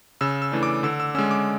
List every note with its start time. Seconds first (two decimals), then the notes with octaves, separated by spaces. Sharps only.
0.21 C#3 E6
0.42 E6
0.52 E3 A3 D4
0.63 D6
0.83 D3 E6
1.00 E6
1.15 G#3 C#4 E6
1.31 D6